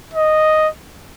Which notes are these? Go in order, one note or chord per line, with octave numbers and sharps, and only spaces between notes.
D#5